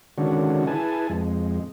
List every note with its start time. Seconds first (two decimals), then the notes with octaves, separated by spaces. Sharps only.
0.18 D3 D#3 G#3 C#4 D4 F#4
0.67 E4 G#4 B4 G#5 A5
1.10 F2 G#3